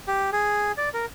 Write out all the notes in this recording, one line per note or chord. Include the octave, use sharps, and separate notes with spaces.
G4
G#4
D5
A#4